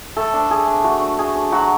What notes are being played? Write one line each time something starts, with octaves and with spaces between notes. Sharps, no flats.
A3 A4
D4
A3 G#4
D4
A3 F#4
D4
A3 G#4
D4
F#3 F#4